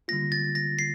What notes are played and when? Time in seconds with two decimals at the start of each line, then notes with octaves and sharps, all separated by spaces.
0.08 D3 G3 A#3 F4 A#6
0.32 A6
0.55 A#6
0.79 C7